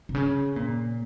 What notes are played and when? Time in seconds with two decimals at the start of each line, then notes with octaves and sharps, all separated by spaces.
0.09 C3
0.15 C#3
0.56 A#2